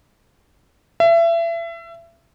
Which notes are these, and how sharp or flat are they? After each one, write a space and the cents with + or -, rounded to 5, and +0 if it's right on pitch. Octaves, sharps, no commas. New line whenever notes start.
E5 +30